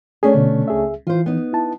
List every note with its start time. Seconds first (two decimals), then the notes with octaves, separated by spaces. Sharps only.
0.23 A3 C#4 D4 G#4
0.34 B2 D3
0.68 C#2 G#4 E5
1.07 E3 F4 C5
1.26 B3 D#4
1.53 E4 A5